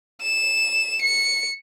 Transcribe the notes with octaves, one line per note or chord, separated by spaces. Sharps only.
E7
C#7